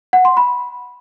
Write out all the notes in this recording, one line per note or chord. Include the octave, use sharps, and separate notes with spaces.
F#5
C6
B5